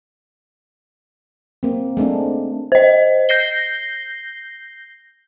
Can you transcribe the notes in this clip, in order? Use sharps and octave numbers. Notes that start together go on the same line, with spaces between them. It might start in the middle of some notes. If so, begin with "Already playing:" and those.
A#3 C4
G#3 A3 C4 D4
C5 D#5
G6 A#6 C7 G7